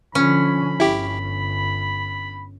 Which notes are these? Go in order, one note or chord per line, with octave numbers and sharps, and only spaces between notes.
D3 F3 C#4 B5
G1 E4 G4